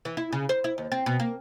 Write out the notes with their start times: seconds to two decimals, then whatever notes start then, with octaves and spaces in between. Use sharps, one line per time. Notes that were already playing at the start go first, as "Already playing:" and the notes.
0.05 E3
0.17 E4
0.33 C#3
0.49 C5
0.64 E4
0.78 D#2
0.92 C4
1.06 B2
1.20 A#3